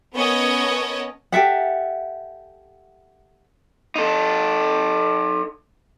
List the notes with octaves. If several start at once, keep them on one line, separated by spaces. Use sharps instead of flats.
B3 C#4 A#4 C#5 D#5 A5
G4 A4 E5 F#5
D#4 A4